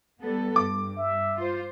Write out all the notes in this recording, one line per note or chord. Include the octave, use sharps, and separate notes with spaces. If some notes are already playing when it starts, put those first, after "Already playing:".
G3 B3 A4
G2 D6
E5
F4 C5